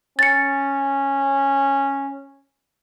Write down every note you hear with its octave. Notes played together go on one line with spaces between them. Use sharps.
C#4 A6 C#7